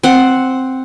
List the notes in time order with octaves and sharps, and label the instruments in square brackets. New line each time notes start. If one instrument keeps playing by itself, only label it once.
[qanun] C4 F#5